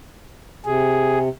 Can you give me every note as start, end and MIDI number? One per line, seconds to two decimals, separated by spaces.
0.65 1.29 48
0.65 1.19 68